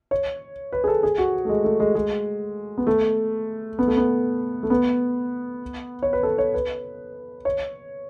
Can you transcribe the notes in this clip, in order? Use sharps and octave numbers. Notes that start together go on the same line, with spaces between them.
C#5
B4
G#4
A4
G#4
F#4
A3
G#3
A3
G#3
G#3
B3
A3
B3
A3
B3
A3
B3
C#5
B4
A4
C#5
B4
C#5